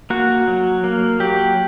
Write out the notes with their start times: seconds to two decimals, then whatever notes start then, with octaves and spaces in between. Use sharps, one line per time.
0.10 A#3 F#4
0.48 F#3
0.84 A#3
1.20 F#3 G4